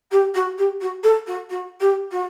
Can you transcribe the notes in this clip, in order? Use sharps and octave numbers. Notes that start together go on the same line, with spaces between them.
G4
F#4
G4
F#4
A4
F#4
F#4
G4
F#4